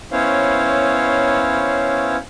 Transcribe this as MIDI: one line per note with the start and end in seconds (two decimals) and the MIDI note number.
0.12 2.17 59
0.12 2.17 61
0.12 2.17 64
0.12 2.17 72
0.12 2.17 73
0.12 2.17 77